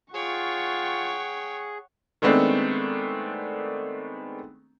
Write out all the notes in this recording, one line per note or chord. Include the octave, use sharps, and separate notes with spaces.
F4 G#4 C#5 F#5 G5 C#6
D#3 G#3 A3 B3 C4 D4